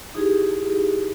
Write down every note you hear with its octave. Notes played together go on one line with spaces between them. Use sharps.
D#4 E4 G4 G#4